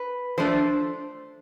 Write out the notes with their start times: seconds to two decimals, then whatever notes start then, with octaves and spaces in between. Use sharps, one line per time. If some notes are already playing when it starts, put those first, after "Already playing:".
Already playing: B4
0.38 F3 A3 D4 C5